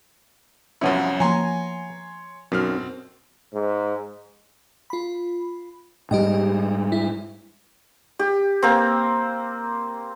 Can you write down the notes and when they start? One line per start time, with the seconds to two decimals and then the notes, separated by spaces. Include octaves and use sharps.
0.81 C2 F#2 F3 B3 C#4 E4 C#5
1.20 F3 A#3 C#5 G#5 A#5 C6
2.52 B1 F#2 B2 C4 F6
3.54 G#2
4.90 F4 B5
6.11 G#2 G3 G4 D#5 G5
6.92 E4
8.19 G4
8.62 A#3 C4